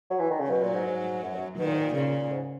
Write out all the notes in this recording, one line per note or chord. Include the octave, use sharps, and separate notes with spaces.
F#3
E3
D#3
C#3
B2 F#3
A#2
G#2
G#2
F#2
F#2
B2 D#3
A#2
G#2
A#2
A#2 C#3
G#2